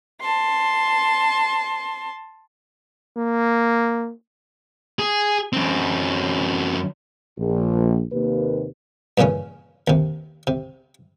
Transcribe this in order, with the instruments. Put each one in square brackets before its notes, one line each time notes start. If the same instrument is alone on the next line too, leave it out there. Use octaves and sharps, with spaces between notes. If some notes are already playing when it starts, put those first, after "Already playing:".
[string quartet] A5 C6
[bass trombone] A#3
[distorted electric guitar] G#4
F#2 C4
[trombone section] A#1
D#2 C3 A#3 B4
[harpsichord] G2 A#2 C#3 E3 C#4
D#2 C3
C3